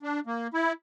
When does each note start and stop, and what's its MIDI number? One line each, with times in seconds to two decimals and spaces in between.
0.03 0.20 62
0.27 0.47 58
0.54 0.72 64